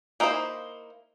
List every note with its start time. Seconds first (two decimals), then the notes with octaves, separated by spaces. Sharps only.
0.20 A#3 D#4 E4 A4 C5